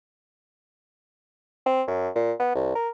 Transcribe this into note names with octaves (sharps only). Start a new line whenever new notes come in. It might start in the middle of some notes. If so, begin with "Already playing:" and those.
C4
F#2
A#2
B3
C2
A#4